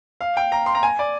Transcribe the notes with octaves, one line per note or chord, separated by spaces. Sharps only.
F5
G5
A#5
C6
A#5
G#5
D5